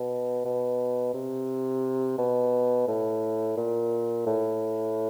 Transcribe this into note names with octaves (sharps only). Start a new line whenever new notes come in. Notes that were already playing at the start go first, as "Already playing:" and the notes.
Already playing: B2
B2
C3
B2
A2
A#2
A2